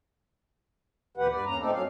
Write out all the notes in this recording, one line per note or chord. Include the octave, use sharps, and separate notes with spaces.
D2 A#2 E3 G4 B4 F#5
G2 B4 D5
E2 A#3 C#4 A#5
A#2 A3 C4 D#4 A4 D5
G2 F#3 C#4 F5